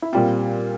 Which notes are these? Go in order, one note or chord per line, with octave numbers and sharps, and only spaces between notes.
E4
A#2 G3 C4 F4